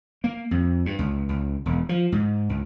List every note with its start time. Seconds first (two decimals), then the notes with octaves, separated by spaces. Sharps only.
0.24 A#3
0.51 F2
0.86 G2
0.99 C#2
1.29 C#2
1.66 E1
1.89 F3
2.12 G#2
2.49 C#2